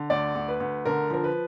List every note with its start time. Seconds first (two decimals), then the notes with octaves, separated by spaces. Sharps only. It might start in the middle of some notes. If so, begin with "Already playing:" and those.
Already playing: D3
0.10 D2 D5
0.35 D2
0.48 B4
0.60 D2
0.86 D3 A#4
1.10 F3 A#4
1.24 B4